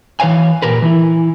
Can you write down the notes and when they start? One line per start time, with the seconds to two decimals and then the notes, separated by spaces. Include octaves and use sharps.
0.20 E3 B4 C#5 F5 G#5
0.62 A#2 G4 A#4 B4
0.82 E3 E4